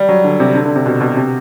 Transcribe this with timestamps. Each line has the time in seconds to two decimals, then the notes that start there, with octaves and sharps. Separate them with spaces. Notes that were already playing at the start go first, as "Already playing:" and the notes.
Already playing: G3
0.09 F#3
0.24 D3
0.40 C3
0.55 D3
0.66 D3
0.76 C3
0.86 B2
1.01 B2
1.17 C3